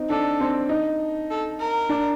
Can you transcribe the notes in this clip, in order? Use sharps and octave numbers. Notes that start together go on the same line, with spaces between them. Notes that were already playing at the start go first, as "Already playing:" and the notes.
Already playing: C4 D#4
D4 A4
C4
D#4
A4
A#4
D4